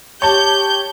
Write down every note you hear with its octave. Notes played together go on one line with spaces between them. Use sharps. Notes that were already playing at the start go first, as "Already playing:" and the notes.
G4 C#5 A5 G6